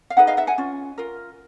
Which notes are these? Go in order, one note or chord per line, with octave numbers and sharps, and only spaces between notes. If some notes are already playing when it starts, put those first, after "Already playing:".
F5
D#4 G#4 B4 E5 F#5
D#5 F5
E5 F#5
F#5 G#5
C#4 F4
F4 A#4